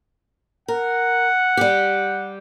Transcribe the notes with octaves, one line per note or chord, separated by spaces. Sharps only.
A#4 F#5
G3 G4